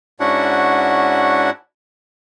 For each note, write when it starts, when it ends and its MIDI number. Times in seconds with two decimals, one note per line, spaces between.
0.20 1.50 44
0.20 1.50 61
0.20 1.50 62
0.20 1.50 64
0.20 1.50 66
0.20 1.50 78